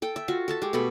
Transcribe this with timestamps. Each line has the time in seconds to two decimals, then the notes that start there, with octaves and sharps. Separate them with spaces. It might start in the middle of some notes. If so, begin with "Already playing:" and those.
0.02 A4 G5
0.16 E5
0.28 F4 F#4
0.48 A4 E5 A5
0.62 G#3 G4
0.73 B2 A3 A4 B5